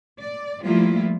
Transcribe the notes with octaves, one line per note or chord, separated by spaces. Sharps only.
D5
F3 G3 A3 A#3 E4 F4